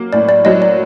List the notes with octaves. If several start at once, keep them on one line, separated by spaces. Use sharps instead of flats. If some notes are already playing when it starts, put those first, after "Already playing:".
Already playing: F#3 A#3
A2 D5
D5
F#3 D#5
D5